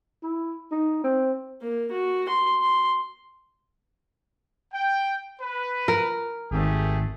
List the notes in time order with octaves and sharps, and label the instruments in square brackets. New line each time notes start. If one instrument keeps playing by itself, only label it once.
[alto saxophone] E4
D#4
C4
[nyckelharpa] A#3
F#4
C6
C6
[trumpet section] G5
B4
[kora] A#4
[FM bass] G#1 [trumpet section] A3 G4 G#4